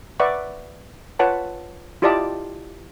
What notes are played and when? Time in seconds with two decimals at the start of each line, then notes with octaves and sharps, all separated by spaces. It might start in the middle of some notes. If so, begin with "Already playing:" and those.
0.20 B4 D5 E5 F#5 C#6
1.19 F4 B4 C#5 F#5 A5
2.02 E4 F4 G4 D5 D#5 A5